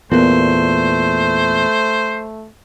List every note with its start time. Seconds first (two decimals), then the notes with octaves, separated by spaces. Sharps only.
0.12 E2 A#2 A3 B3 A#4 C5